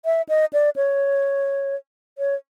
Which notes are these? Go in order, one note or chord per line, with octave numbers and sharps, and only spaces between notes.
E5
D#5
D5
C#5
C#5